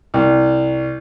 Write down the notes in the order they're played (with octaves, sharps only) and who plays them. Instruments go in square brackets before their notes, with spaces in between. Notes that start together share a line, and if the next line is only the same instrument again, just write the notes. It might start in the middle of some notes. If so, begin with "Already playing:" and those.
[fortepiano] C2